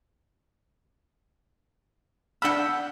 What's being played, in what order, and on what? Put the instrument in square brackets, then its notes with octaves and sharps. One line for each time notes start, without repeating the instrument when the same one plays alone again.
[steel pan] D4 B5 [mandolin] F#5 G5 E6